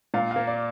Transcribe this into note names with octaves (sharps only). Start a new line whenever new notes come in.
A#2 F5
A#3 F5
D5